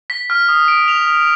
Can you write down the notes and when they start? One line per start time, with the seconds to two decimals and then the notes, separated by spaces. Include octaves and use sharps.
0.10 B6
0.30 F6
0.48 D#6
0.68 D7
0.88 F7
1.07 D#6